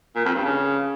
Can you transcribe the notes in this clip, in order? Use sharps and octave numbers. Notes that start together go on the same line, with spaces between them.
A#2
F2
G2
C#3